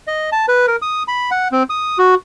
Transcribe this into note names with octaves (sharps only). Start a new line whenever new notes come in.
D#5
A5
B4
A#4
D#6
B5
F#5
C4
D#6
F#4